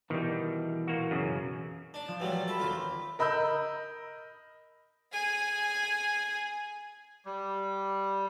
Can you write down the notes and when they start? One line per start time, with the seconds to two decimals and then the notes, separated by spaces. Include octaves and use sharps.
0.10 B2 D#3 E3 G3
0.87 A#2 A#3 F#4
1.11 F#2 C#3
1.94 D4
2.08 F3
2.20 E3 F#3 G3 E5
2.32 A6
2.48 A4 E5 B5 B6
2.60 D#2 D#3 C4 F4
3.19 A#4 D#5 B5 E6 G6
5.12 G#4 G#5
7.25 G3